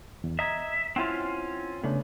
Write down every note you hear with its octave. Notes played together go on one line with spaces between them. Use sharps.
E2
D#5 E5 A#5 G#6
C4 C#4 E4 F4 F#5
C#3 A3 B3 D4